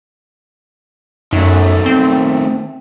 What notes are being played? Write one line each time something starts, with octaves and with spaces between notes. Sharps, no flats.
F#2 D#3 A3
C4